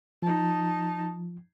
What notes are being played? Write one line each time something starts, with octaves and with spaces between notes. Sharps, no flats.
F3 D#4 A5